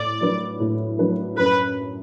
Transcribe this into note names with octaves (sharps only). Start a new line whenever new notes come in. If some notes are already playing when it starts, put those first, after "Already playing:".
Already playing: A2 D5
F#3 D4 B4
A2
F#3 D4 B4
F#2 B4